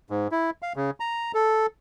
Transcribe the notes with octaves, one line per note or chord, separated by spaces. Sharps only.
G#2
E4
F5
C#3
A#5
A4